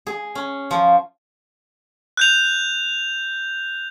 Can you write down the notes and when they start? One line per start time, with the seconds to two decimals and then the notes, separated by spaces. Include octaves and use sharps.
0.07 G#4
0.35 C#4
0.71 F3
2.17 F#6 G6 F7